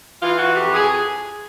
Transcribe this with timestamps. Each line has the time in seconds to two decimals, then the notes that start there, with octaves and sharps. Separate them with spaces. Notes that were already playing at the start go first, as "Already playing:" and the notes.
0.21 E3 F4
0.39 F#4
0.56 F2 G4
0.74 G#4